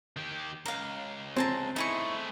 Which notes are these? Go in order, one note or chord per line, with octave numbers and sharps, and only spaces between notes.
D#3 G4
C#2 F5 A#5
C4 G#4 A5 A#5
A3 D#4 E4 G#4 C#6